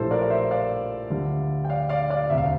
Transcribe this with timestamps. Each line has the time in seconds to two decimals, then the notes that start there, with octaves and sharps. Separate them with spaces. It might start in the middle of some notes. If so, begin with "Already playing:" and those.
Already playing: A#1 A2 E3 G3 A4 C5
0.11 A#4 D5
0.22 D5
0.30 C5 E5
0.51 D5 F5
1.10 D2 D3 G3
1.65 G5
1.70 D5 F5
1.89 D5 F5
2.10 D5 F5
2.30 E1 D2 C3 E5
2.38 F5